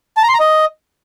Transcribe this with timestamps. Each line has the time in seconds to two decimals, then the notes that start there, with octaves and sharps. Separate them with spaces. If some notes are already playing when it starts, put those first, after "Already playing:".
0.17 A5
0.23 A#5
0.28 C6
0.34 A#5
0.40 D#5